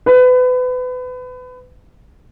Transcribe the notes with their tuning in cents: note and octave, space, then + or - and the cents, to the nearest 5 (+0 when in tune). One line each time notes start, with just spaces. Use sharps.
B4 +30